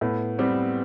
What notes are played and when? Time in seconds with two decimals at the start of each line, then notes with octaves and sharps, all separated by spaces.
0.01 A2 B3
0.38 G3 B3 C4